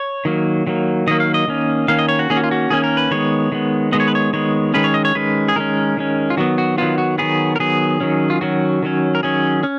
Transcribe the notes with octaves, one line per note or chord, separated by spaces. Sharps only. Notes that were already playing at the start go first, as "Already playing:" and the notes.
Already playing: C#5
D#3 F#3 A#3
D#3 F#3 A#3
D#3 F#3 A#3 D#5
F5
D#5
D#3 A#3 C#4
D#3 A#3 C#4 F5
D#5
C#5
F#4
D#3 A#3 C#4 G#4
F#4
F4
F#4
D#3 A#3 C#4 G#4
A#4
B4
D#3 G#3 B3 C#5
D#3 G#3 B3
D#3 G#3 B3 D#5
C#5
B4
C#5
D#3 G#3 B3 C#5
D#3 G#3 C#4 B4
C#5
D#5
C#5
D#3 G#3 C#4 B4
G#4
D#3 G#3 C#4 A#4
D#3 G#3 C#4
F4
D#3 F#3 B3 F#4
F#4
D#3 F#3 B3 F4
F#4
D#3 F#3 B3 G#4
A#4
D#3 F#3 B3 G#4
D#3 F#3 C#4
F4
D#3 F#3 C#4 F#4
D#3 F#3 C#4
A#4
D#3 F#3 C#4 G#4
C#4